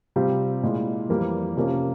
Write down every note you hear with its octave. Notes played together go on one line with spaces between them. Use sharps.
C3 G3 C4 F4
A#2 G#3 E4
F2 E3 G3 A#3
C3 F3 A#3 C#4